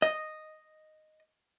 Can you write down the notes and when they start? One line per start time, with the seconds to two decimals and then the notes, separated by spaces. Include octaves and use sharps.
0.02 D#5